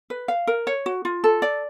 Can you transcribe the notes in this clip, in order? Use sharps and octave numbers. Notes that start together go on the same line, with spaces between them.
B4
F5
A#4
C#5
F#4
F4
A4
D5